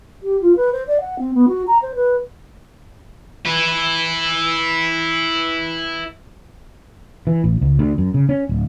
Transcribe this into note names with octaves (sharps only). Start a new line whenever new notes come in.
G4
F4
B4
C5
D5
F#5
C4
B3
F#4
A#5
C5
B4
E4 B4
E3
A1
C#2
D2
F#2
C#3
C#4
D1